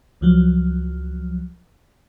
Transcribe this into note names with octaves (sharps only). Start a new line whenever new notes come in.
C#2 F3 F#3